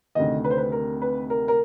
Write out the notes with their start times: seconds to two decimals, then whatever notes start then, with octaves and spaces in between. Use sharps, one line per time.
0.15 D2 C3 D#3 D#5
0.44 B4
0.50 C5
0.57 B4
0.72 A#4
1.02 B4
1.30 A#4
1.48 A#4